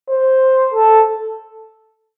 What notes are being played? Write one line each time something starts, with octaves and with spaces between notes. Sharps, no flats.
C5
A4